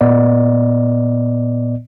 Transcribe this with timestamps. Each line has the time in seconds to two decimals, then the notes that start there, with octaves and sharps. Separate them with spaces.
0.01 A#2 B3 D5 D#5